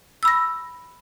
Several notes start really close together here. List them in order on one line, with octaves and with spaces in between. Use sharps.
E6 B5 A#6